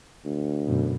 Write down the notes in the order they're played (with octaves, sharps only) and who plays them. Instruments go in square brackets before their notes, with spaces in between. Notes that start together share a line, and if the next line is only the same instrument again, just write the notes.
[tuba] D2
[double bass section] F#2 B2